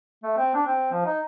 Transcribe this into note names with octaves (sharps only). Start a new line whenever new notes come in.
A3
C4
D4
C4
F3
D#4